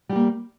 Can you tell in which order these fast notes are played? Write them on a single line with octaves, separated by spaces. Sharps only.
G3 G4 A#3